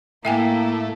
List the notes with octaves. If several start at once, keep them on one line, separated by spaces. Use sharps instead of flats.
A2 A3 A#3 E4 E5 G5 G#5